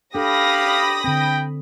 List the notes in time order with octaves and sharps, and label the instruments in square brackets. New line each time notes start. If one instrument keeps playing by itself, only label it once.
[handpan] D4 A4 [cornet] G4 [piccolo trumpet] F5 [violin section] B5 D#6 A#6
[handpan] D3 C4 [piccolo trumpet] G5